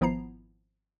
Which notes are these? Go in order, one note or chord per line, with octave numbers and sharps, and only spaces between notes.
G#1 F3 B3 E4 A#5 C7